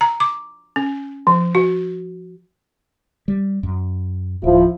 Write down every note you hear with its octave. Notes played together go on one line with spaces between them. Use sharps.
A#5
D6
C#4
F3
F#4
G3
F#2
D1 F3 E4